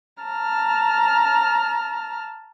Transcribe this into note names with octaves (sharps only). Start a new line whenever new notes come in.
A5 A#5 F6